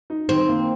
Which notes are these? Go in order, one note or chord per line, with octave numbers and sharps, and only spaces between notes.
D#4
D#3 C4
A#3